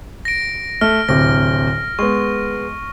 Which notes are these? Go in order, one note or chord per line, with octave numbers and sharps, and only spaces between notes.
A#6 D7
A3 F6
D1 C3 A#6
G#3 B3 C#6